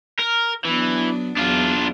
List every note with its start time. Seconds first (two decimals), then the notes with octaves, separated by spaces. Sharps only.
0.19 A#4
0.65 E3 F#3 B3 D4
1.37 E2 F#3 D4 F4